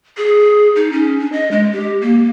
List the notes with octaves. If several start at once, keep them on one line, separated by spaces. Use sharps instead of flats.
G#4
D#4
C#4
D4
D#5
G#3
G4
A#3